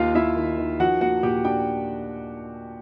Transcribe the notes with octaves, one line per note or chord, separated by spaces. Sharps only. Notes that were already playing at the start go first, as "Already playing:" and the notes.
Already playing: D#2 F4 F5
D#2 E4 E5
D#3
D#3
F3 F#4 F#5
A#3 F#4 F#5
A#2 G4 G5
D4 G4 G5